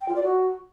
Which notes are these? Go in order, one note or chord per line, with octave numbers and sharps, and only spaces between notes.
G5
F4
D5
F#4